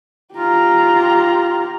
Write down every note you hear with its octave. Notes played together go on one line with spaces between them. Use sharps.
F4 G4 A#5